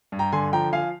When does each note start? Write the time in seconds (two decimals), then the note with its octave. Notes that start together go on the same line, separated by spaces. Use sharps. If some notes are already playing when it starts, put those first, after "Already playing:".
0.12 G2
0.19 G5 A#5
0.32 D3 G#5 C6
0.53 F3 G5 A#5
0.73 F3 F5 G#5